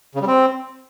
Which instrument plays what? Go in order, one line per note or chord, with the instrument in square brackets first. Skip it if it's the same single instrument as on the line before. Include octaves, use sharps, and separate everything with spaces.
[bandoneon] C#3
G3
C4